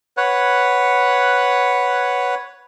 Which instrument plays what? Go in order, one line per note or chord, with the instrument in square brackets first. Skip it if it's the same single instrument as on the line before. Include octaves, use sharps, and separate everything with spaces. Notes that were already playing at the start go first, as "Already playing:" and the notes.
[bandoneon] B4 C#5 F#5